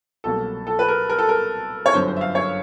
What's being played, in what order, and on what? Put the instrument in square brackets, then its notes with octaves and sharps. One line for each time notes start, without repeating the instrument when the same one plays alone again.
[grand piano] C2 B2 F#3 A#3 A4
A4
B4
A#4
A#4
A4
A#4
C#5
G1 F#2 D3 C5
C5
E5
F5
C#5